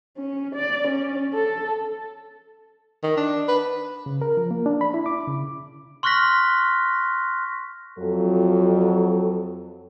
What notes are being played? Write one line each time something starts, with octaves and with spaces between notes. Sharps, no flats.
C#4
D5
C#4
A4
D#3
D4
B4
C#3
A#4
F3
A#3
D4
B5
E4
D6
C#3
C6 C#6 F6 F#6 A#6 B6
F2 F#3 A4